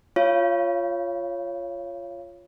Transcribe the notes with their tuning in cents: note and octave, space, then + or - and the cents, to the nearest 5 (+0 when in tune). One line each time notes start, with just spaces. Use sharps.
F4 +0 C#5 +0 F5 -30